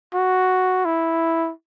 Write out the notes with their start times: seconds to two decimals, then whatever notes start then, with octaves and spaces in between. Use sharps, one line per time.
0.14 F#4
0.85 E4